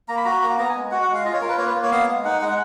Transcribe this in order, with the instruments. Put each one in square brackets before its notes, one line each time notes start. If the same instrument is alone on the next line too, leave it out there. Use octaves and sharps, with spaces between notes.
[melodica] A#3 A#5
B5
F#4 A#5
A#3 A#5
B3 A#5
G#5
G#3
F#4 F#5
F#5
G#3
F5
F4 D#5
C#5
F4 A#4
B4
A#3 C#5
B4
A#3
C#5
B3 F5
G#3
D#4 F#5
G#3 F#5